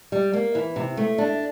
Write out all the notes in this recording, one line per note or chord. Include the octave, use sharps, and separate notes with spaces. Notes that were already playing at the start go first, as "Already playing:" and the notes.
G3
A#3
E3
C3
A3
D4